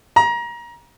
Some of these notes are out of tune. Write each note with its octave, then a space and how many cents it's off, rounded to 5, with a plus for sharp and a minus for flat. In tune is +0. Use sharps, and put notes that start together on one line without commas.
A#5 +25